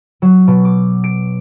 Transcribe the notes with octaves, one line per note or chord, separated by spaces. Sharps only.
F#3
B2
D6
D7